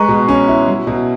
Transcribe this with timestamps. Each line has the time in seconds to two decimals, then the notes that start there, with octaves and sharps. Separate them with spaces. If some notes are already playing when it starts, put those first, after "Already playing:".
Already playing: G#3 B4 A#5 C#6
0.08 B2
0.28 C#4
0.48 E4
0.68 F#3
0.87 B2